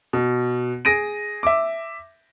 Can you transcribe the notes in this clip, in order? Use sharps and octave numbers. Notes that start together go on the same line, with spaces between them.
B2
G#4 A#6 D7 D#7
E5 D6